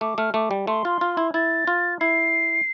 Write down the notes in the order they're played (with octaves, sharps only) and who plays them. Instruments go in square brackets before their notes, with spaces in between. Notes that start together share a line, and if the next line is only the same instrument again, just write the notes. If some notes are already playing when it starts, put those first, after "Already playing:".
[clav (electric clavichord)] A3 [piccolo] D6
[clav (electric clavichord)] A3 [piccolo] F6
[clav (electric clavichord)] A3 [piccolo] D6
[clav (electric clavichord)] G3
[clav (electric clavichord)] A3 [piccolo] C6
[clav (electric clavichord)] F4
F4
E4
[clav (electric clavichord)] E4 [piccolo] A6
[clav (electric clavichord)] F4
[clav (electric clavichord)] E4 [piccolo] C7